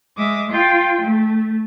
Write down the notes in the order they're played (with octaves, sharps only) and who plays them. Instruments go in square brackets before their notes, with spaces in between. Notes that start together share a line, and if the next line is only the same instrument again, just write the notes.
[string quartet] G#3 E5 D6 D#6
F4 G5
A3